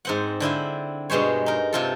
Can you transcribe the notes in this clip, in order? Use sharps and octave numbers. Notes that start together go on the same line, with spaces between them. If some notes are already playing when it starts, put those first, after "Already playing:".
G#2 C4 F#5
D3 C4 E4 F5
G2 B2 G#3 C5 C#5
D#4 A#4
C3 F4 A4